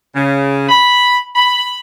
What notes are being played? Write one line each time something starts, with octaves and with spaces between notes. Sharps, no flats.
C#3
B5
B5